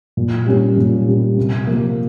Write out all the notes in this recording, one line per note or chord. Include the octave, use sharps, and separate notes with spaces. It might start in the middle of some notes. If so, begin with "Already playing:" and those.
A#2
G3 C#4 G4
A#2
G3 C#4 G4
C3
F3 A#3